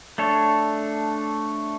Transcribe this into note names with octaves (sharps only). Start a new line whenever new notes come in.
A3 D4 A4 C#5